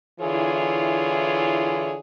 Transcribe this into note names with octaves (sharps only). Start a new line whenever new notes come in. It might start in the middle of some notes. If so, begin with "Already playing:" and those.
D3 E3 E4 F4 G#4 C#5